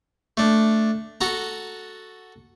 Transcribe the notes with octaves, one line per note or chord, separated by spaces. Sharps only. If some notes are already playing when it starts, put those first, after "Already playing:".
A3 D4
F#4 A4 A#5